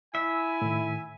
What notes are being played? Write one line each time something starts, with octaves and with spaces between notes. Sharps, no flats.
E4 E5 G#5
A2 D#3